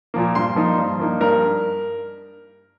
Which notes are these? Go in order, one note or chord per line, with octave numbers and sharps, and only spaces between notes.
A#2 F3 A#3
G2 C6
F3 A#3 D#4
G2
F3 A#3 D#4
G2 A#4